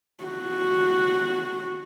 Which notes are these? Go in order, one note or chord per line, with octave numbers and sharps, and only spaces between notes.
F#4